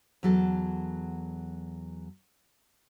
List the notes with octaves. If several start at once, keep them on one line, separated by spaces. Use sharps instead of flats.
E2 F#3 A4